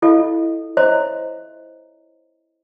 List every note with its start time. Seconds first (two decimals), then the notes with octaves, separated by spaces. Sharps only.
0.02 E4 F4 A4 D#5 F5
0.77 C5 C#5 D#5 E5 A#5 C6